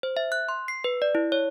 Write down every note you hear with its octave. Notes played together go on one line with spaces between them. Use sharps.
C5
E5
F#6
C6
C7
B4
D5
E4
C#5